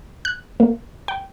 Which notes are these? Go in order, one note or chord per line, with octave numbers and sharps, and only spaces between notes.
F#6
A#3
G5